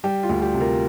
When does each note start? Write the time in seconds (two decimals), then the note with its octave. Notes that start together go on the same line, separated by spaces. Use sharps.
0.04 G3 G4
0.23 F4
0.29 D2
0.42 G4
0.54 C3
0.60 F4 A#4